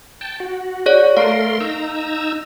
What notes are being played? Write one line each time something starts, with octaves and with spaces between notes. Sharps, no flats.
G5 A5
F#4
G#4 C#5 D5
A3 A#4 F5 C6
D#4 A#5 E6